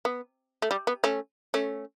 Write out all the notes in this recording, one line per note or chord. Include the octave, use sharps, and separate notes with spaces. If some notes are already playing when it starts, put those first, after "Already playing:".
B3
A3
G3
B3
A3 C#4
A3 C#4